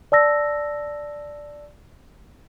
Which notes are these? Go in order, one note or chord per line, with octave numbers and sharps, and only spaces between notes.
D5 A5 E6 A#6